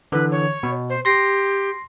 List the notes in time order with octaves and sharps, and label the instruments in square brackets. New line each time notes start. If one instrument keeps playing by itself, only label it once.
[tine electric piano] D3 E3 [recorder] B4
[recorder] C#5
[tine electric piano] B2
[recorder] C5
[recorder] G4 [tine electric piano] C6 A#6 C7